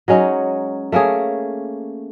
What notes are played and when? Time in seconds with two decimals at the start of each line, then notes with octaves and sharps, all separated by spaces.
0.08 F#3 G#3 C#4 D#4
0.92 A3 A#3 C#4 G#4